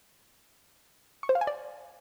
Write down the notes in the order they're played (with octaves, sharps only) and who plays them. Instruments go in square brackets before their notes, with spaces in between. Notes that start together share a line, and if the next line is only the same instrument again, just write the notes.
[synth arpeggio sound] C#6
C5
F5
G#5
D5